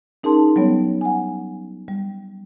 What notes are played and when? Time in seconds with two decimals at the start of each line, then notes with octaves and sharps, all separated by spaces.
0.23 C#4 D#4 G#4 A#4 A5 C6
0.56 F#3 G3 B3 C#5
1.01 F#5 G#5
1.88 G3